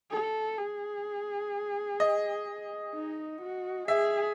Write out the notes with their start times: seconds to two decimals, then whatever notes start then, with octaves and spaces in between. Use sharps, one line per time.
0.11 A4
0.58 G#4
2.00 D#5
2.95 D#4
3.42 F#4
3.88 G#4 E5